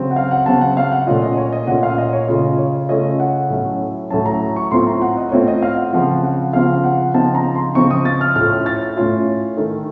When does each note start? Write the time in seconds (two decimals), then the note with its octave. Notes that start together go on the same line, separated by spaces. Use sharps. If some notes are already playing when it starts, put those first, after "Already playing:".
Already playing: C#3 F#3 C4
0.11 F#5
0.16 F5
0.31 F#5
0.46 C#3 F#3 C4 A5
0.61 F#5
0.77 F5
0.92 F#5
1.07 A#2 A3 C#4 F4 D#5
1.22 D#5
1.37 C#5
1.53 D#5
1.67 A#2 A3 C#4 F4 F#5
1.83 F5
1.98 D#5
2.13 C#5
2.28 C#3 A3 C#4 F4 D#5
2.59 C#5
2.89 C#3 A3 C#4 F4 D#5
3.20 F#5
3.50 A2 F#3 A3 C#4
4.11 A2 F#3 A3 C#4 A5
4.26 A#5
4.56 C#6
4.71 A2 A3 C4 F4 C6
4.87 A#5
5.02 F#5
5.17 D#5
5.32 A2 A3 C4 F4 C#5
5.48 D#5
5.62 F5
5.77 F#5
5.93 C#3 F3 C4 F4 F#5
6.24 F#5
6.53 C#3 F3 C4 F4 F5
6.84 F#5
7.14 C#3 F3 C4 D#4 A5
7.35 A#5
7.55 C6
7.75 C#3 F3 C4 D#4 C#6
7.91 D#6
8.05 A6
8.21 F6
8.36 A2 A3 C#4 F4 F6
8.66 A6
8.97 A2 A3 C#4 F4
9.57 D#3 A3 D#4